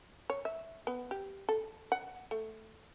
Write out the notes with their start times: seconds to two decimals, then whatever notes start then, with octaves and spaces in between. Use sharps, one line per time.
0.30 C#5
0.45 E5
0.87 B3
1.11 G4
1.49 A4
1.92 F#5
2.31 A3